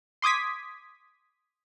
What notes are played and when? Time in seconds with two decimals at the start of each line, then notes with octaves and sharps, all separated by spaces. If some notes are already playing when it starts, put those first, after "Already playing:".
0.22 C6 D6 D#6 G#6 B6